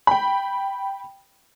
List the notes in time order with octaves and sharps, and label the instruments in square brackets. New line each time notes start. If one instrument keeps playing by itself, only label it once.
[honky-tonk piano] G5 B5